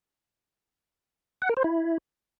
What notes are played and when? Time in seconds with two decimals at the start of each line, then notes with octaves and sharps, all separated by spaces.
1.42 F#5
1.49 A#4
1.57 C5
1.64 E4